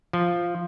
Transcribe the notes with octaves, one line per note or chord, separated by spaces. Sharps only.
F3